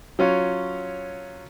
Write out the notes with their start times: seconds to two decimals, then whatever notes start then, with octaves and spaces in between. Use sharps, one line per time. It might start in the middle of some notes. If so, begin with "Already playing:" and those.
0.19 F#3 C#4 F4